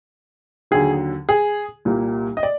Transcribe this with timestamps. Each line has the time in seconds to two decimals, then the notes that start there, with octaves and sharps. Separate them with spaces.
0.71 D#2 D3 F#3 G#4
1.29 G#4
1.85 C2 A#2 G3 A#3
2.37 D#5
2.43 D5